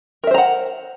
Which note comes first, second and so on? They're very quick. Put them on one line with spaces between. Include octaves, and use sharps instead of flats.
A#4 E5 C5 A#5 F#5